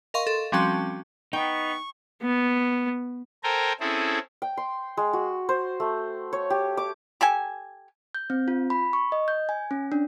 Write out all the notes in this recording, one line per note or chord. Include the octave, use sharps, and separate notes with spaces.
A#4 D#5 F5 C6 C#6
A4
F3 G3 C4 C#4 F#4 A5
B3 D#4 G5 C#6
B3
A4 A#4 C5 G5 G#5 A#5
C4 C#4 E4 G#4 A4
G5
C6
G#3
F#4
C5
A3
C#5
G4
D6
G4 A4 G#5
G6
C4
F4
B5
C#6
D#5
G6
G#5
C#4
D4